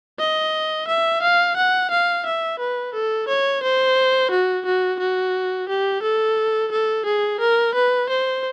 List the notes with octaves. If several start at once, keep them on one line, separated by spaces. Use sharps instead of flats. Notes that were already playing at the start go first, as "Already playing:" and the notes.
D#5
E5
F5
F#5
F5
E5
B4
A4
C#5
C5
F#4
F#4
F#4
G4
A4
A4
G#4
A#4
B4
C5